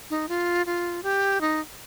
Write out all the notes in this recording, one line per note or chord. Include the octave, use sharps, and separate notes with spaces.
D#4
F4
F4
G4
D#4